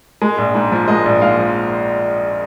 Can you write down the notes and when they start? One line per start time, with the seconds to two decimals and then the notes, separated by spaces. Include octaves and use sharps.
0.22 G#3
0.38 A#1
0.55 G#2
0.72 F3
0.88 G#3 D#5
1.06 A#1
1.22 G#2 F5
1.38 F3